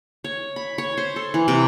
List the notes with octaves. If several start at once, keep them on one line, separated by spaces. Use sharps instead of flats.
C#5
B5
C#5
C5
A4
E3
C3